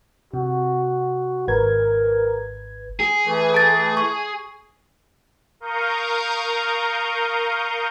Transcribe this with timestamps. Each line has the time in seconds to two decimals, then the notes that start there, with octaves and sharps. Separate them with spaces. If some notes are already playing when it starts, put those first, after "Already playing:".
0.34 C3 F#4
1.48 G#1 A#4 B4 G#6
3.00 G#4
3.25 E3 A3
3.54 A5 A6
3.97 C#6
5.60 A#4 F5 A#5 C#6 D#6 G6